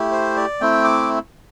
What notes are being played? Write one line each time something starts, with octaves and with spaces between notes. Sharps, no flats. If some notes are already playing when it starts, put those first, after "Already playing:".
Already playing: A3 E4 G4
C5
D5
A3 C4 E4 G5
D6